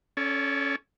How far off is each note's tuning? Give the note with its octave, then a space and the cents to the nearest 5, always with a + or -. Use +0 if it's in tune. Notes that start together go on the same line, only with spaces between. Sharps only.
C#4 +0 A4 -15 D5 -40